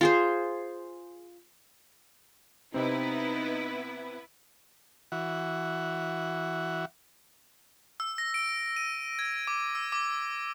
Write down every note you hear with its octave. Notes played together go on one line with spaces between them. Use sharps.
F4 G#4 C5
C3 B3 C4 D#4 E4 B4
E3 F#4
E6
A#6
D7
D#7
G#6
D6
E6
D6